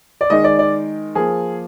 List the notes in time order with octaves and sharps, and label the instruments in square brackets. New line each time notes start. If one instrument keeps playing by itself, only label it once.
[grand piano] D5
D#3 G#3 D#4 D#5
D5
D5
F3 A#3 F4 G#4